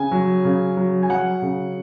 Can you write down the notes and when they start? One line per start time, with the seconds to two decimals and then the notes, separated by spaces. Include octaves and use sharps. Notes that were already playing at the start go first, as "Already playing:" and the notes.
Already playing: C#3 G#5
0.11 F#3
0.45 C#3
0.77 F#3
1.03 G#5
1.09 F#3 F#5
1.42 C#3